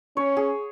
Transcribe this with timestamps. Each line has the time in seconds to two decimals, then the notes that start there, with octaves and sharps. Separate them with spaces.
0.17 C#4 C#5
0.37 G#4